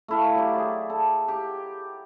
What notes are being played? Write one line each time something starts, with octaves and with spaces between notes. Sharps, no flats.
A3 E4 F5
F#3 G4
G#4 D5
A4
G4